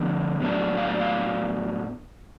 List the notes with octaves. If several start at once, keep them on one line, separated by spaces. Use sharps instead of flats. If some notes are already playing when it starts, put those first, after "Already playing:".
Already playing: D3 F3 B3 D4
A2 F#3 B3 D4
F5
D5
F5